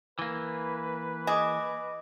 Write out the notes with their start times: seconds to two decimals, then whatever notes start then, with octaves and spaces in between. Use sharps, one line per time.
0.19 E3 A#3 B4
1.27 G#4 D#5 D6